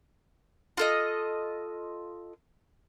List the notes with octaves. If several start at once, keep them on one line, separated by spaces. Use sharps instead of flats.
F4 A4 D#5